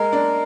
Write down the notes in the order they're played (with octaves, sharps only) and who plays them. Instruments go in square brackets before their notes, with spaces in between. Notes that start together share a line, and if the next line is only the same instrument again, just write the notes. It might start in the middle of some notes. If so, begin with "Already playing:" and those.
Already playing: [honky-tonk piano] G#3 [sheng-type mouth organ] A#4
[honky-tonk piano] D4